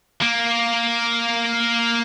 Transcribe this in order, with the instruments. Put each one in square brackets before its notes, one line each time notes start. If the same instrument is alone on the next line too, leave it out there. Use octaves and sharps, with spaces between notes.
[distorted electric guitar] A#3